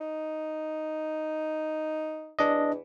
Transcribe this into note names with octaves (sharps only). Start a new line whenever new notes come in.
D#4
E2 D4 D#5